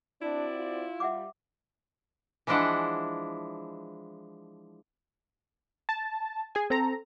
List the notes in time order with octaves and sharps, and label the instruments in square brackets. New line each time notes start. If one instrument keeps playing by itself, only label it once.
[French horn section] C4 F#4 D5 [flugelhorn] D4 [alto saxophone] E4
[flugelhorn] F4
[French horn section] G3 [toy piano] E5 F#5 D6
[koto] E3 F3 G#3 D4 E4 F#5
[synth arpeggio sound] A5
G#4 G#5
C4 A4 A#5